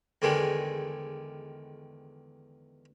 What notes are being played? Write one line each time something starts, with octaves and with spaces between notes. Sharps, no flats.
E2 D3 D#3 G3 G#3